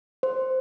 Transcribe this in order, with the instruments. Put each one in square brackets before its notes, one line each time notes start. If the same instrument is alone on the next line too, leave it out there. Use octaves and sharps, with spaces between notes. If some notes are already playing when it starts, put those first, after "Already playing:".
[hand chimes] C5